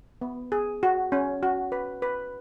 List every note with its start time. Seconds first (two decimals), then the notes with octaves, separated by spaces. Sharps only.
0.21 B3
0.52 G#4
0.83 F#4
1.12 C#4
1.43 F#4
1.72 B4
2.02 B4